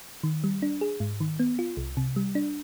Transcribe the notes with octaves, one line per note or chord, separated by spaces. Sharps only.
D#3
G3
D4
G#4
G#2
D#3
B3
F4
C2
C3
G3
D4